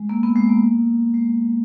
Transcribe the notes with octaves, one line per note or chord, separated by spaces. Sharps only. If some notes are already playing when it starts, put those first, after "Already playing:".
Already playing: G#3
A#3
B3
G#3
A#3
G#3